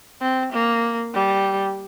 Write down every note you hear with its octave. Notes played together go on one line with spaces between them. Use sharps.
C4
A#3
G3